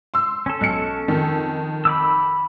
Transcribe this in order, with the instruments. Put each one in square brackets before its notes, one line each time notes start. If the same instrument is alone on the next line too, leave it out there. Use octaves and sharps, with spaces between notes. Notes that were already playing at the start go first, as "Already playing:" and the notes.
[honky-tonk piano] C6 E6
[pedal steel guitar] C#4 A4
[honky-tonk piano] B1 C#7
F2 D#3
[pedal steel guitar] B5 D6 E6